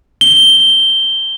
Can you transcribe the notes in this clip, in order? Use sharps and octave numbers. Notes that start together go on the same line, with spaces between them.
G7